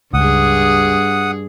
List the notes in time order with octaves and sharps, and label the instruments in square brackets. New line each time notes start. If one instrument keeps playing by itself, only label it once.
[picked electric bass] C#2 [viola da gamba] G2 G#4 [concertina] F#5 D#6